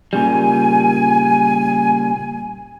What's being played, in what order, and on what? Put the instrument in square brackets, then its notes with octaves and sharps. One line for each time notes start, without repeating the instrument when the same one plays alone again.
[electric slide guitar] A#2 C#3 G3 [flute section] G#5